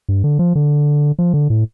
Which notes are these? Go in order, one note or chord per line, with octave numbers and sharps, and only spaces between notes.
G2
D3
F3
D3
F3
D3
A2